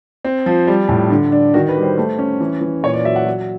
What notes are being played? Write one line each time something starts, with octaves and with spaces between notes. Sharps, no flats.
C4
F3
G3
A2
D3
D4
D#3 F#4
B4
G3
C5
A3
C#4
E3
E3
A#2 C#5
D5
F#3 E5
F#5
F#3